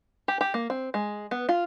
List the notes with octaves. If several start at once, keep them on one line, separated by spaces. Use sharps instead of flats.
G4
G4
A#3
C4
G#3
B3
F4